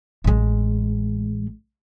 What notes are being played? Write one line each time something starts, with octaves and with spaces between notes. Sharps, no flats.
A1 G#3